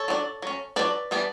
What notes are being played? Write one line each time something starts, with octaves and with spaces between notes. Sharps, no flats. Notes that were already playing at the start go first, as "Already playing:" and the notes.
Already playing: A4 C#5
F#3 B3 D4
F#3 C#4
F#3 A3 D4 B4 D5
E3 G3 B3 D4